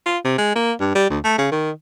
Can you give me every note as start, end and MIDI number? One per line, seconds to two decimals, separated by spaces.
0.06 0.18 65
0.24 0.33 48
0.38 0.55 56
0.56 0.72 58
0.80 0.91 43
0.95 1.09 55
1.10 1.19 38
1.24 1.38 57
1.38 1.50 49
1.52 1.71 51